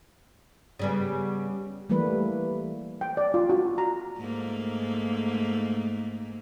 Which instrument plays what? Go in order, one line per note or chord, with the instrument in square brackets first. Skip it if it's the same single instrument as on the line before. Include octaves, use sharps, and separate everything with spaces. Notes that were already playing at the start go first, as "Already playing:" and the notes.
[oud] C#3 G3 B3
[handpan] E3 G3 A3 A#3 B4
[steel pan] G5
D5
F4
F#4
A#5
[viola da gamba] G#2 A3 A#3